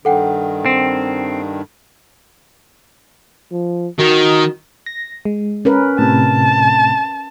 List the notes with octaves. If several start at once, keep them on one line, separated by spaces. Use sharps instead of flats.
G2 D#3 A4 F#5 G5
C4
F3
D#3 F#4
A#6
G#3
C#4 A#4 B4
A2 C3 A5